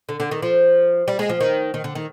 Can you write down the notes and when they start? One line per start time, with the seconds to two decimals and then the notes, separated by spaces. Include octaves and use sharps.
0.09 D3
0.20 D3
0.31 D#3
0.42 F3
1.08 G3
1.19 G#3
1.29 F3
1.40 D#3
1.74 D#3
1.84 D3
1.95 D#3